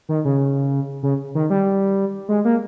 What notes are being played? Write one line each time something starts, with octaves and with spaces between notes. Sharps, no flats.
D#3
C#3
C#3
D#3
G3
G#3
A#3